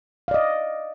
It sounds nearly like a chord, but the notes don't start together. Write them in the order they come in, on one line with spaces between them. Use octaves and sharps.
F5 D5 D#5